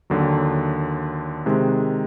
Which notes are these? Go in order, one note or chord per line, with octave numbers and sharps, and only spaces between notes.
D#2 D3 F#3
C3 D#3 G#3